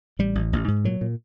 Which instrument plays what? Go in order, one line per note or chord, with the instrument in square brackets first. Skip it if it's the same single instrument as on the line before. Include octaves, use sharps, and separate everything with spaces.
[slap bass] A1 G3
A1
A1
G#2
A#2 F#3
A#2